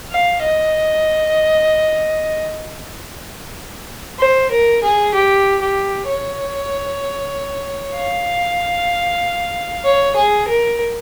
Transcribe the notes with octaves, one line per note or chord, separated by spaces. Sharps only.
F5
D#5
C5
A#4
G#4
G4
G4
C#5
F5
C#5
G#4
A#4